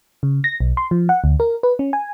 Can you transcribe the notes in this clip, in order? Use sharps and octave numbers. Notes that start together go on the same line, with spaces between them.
C#3
A#6
B1
C6
F3
F#5
D2
A#4
B4
C#4
G#5